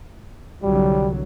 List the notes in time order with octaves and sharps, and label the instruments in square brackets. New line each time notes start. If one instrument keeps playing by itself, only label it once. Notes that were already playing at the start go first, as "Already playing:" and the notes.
[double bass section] C2 D3 F#3 [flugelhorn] G3